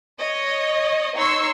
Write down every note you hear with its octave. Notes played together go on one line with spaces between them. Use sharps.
C#5 D#5
D#4 C#5 C6 C#6 E6